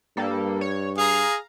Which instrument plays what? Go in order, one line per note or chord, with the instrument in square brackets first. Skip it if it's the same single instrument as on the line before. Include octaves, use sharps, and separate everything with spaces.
[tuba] G2 [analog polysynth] G3 A#3 A4
[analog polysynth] C#5
[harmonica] G#4 [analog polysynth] F5 A#5